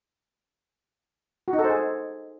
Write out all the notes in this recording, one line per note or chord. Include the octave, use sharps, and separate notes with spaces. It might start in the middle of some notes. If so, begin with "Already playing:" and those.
F#4
D#4
A4
C5
G#4